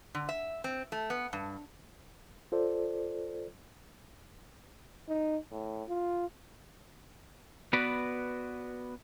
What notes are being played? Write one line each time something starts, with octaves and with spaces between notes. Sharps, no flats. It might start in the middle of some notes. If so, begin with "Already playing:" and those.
D3
E5
C4
A3
B3
G2
F4 A4 C5 D5
D#4
A2
F4
B3 F#4 B4 D5